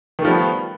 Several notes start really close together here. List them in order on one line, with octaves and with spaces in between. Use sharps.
D#3 A3 F3 G3 B3